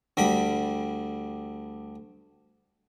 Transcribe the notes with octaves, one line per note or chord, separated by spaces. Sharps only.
D2 D3 G3 B5